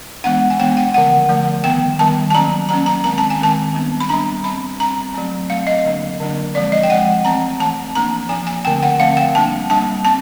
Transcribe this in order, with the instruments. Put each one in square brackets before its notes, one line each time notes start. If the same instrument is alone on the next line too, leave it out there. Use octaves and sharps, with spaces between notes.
[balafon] E3 G#3 B3 D4 F#5
G#5
E3 G#3 B3 D4 G5
F#5
D3 F3 A3 F#5
D3 F3 A3
D#3 G3 B3 G5
D#3 G3 B3 A5
A5
F#3 A#3 C#4 A#5
F#3 A#3 C#4 A#5
A#5
D#3 G#3 C4 A#5
A5
G#5
D#3 G#3 C4 A5
G3 B3 D4
B5
G3 B3 D4 A#5
G3 C4 B5
G3 C4 A#5
F#3 A3 C4
F#3 A3 C4 F5
D#5
D3 F#3 A#3 D4
D3 F#3 A#3 D4
F3 G#3 C4 D5
D#5
G5
F3 G#3 C4 F#5
E3 A3 C4 A#5
E3 A3 C4 A5
F3 A#3 D4 A#5
F3 A#3 D4 G#5
G#5
D3 F3 A3 C4 G5
F#5
D3 F3 A3 C4 F5
G5
G3 A#3 D4 A5
G3 A#3 D4 A5
C4 A5